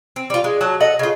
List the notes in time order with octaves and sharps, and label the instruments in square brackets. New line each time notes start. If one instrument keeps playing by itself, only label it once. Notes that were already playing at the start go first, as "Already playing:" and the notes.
[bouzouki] C4
G3 F4
G#3
F#3 F#4 A5
A4 D#5 F#5
C#3 F4